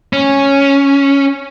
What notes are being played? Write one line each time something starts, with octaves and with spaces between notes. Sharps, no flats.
C#4